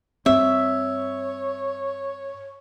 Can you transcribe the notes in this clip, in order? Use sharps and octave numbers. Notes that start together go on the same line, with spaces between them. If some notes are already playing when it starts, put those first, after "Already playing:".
G2 C4 C#5 E5